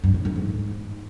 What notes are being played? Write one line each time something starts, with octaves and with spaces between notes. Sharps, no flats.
G2
G#2
F2
G#2